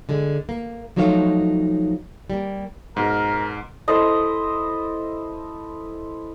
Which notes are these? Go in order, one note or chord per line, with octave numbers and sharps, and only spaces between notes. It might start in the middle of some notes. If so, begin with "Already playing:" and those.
D3 G#3
A#3
F3 F#3 A3 D#4 C#5 F5
G3 A#3
G#2 B2 A#4
E4 A4 C5 D#5